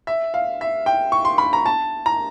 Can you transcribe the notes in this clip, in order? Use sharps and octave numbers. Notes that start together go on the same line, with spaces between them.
E5
F5
E5
G5
C#6
C6
B5
A#5
A5
A#5